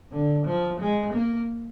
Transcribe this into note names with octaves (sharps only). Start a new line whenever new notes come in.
D3
F3
G#3
A#3